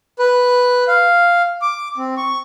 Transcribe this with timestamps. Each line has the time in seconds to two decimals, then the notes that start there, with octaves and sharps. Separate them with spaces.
0.19 B4
0.88 F5
1.62 D6
1.98 C4
2.17 C#6